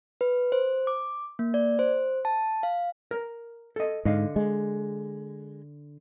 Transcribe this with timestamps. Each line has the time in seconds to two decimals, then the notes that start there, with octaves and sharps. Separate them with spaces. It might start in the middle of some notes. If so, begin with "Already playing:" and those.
0.21 B4
0.52 C5
0.87 D6
1.39 A#3
1.54 D5
1.79 C5
2.25 A5
2.63 F5
3.11 A#4
3.76 A4 D#5
4.05 G#2 D3 D#5 F5
4.36 G#3